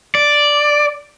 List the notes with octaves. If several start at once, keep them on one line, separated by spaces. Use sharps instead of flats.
D5